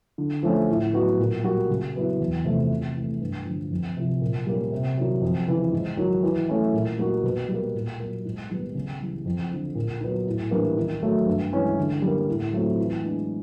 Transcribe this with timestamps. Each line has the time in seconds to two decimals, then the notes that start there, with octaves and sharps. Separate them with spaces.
0.18 D3
0.43 F3 A3 C#4
0.69 A2
0.93 F#3 B3 D#4 F#4
1.19 A#2
1.44 G3 A#3 D#4 F#4
1.69 C#3
1.94 F#3 B3 E4
2.20 E2
2.45 C3 F3 A3
2.70 C3
2.95 E3
3.00 A3
3.21 G2
3.45 D3 F3
3.71 F2
3.97 C3 F3
4.21 A#2
4.47 G3 A#3 C#4
4.72 C3
4.97 D#3 F#3
5.22 F2
5.48 C#3 E3
5.72 G#2
5.97 D#3 F#3
6.23 E3
6.49 A3 C#4 E4
6.73 A#2
6.98 G3 A#3 D#4 F#4
7.23 B2
7.49 G3
7.54 A#3
7.75 A#2
8.00 F#3 A#3
8.25 G#2
8.50 D#3 G3 B3
8.75 C#3
9.01 E3 G3
9.25 F2
9.51 D3 F3
9.75 A#2
10.00 F#3 B3 D#4
10.27 A2
10.51 E3 G3 A#3 D4
10.77 D#3
11.02 F#3 A3
11.26 G2
11.52 E3 G#3 C#4
11.77 D3
12.02 G3
12.07 A#3
12.28 A2
12.53 F#3 A3 C4 F4
12.78 E3
13.04 G#3 B3 D4